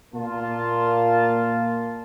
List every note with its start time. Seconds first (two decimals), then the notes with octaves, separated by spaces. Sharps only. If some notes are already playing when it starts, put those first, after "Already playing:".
0.15 A#2 A#3 F4 A5